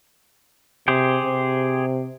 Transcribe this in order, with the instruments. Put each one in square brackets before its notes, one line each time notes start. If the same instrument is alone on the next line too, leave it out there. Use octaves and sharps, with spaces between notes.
[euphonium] C3 [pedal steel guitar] G4 G#4 C5
[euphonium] C3